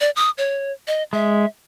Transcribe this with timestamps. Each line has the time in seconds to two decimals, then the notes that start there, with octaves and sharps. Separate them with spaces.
0.01 D5
0.16 D#6
0.38 C#5
0.87 D#5
1.13 G#3 E5